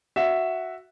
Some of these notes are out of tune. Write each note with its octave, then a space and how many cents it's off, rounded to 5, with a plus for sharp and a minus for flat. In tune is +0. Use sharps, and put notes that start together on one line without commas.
F#4 +0 E5 +0